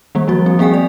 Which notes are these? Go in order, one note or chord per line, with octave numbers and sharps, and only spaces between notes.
D#3 G3 A#3
F3 G3 F#4
C4
A#3 C4 G#4 G5 G#5
D5